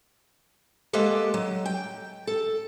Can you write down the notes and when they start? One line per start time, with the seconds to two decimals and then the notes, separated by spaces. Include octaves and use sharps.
0.93 G#3 A#3 B3 G4 A4
1.34 F#3
1.66 G5
2.27 A4